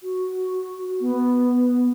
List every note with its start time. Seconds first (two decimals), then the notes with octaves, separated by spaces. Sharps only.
0.03 F#4
1.01 B3